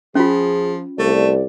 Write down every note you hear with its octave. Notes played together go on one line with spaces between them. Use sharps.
F3 C#4 F4 G#4
C2 A3 D5